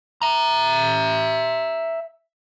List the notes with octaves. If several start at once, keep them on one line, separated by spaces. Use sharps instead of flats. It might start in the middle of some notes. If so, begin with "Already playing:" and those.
E5 A#5